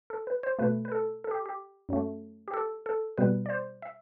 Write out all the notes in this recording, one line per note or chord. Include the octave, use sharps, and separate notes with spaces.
A4
B4
C5
B2 A3 B4
B4
A4
A4
G4
G4
F#2 F#3 A3
G4
A4
A4
B2 G3 B3 B4
D5
C5
E5